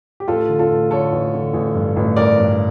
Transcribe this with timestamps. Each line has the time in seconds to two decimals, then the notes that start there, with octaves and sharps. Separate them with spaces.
0.20 G4
0.28 A1 F4 A4
0.49 D3
0.59 F4 A4
0.70 A1
0.91 D3 A4 C#5
1.12 A1
1.34 D3
1.54 A1
1.75 G2
1.96 A1
2.16 A1 A#4 D5
2.38 G2